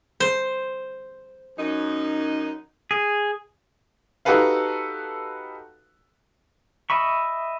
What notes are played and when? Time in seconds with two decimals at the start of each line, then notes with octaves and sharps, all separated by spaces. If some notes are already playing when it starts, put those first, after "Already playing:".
0.20 C5
1.57 F#2 D#4
2.91 G#4
4.25 D#4 F#4 G4 A4 B4 F5
6.90 D#5 E5 B5 C#6